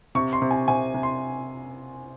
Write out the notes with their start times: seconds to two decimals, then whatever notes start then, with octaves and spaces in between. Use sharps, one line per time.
0.15 C3 C#6
0.33 C6
0.42 C3
0.51 G#5
0.68 C3 G#5
0.94 C3
1.03 C6